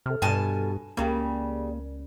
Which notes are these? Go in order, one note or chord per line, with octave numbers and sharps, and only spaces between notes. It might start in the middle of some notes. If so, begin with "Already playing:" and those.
C3 A4 F6
G2 B2 G#5 A5
C#2 C#3 G3 A#3 C#4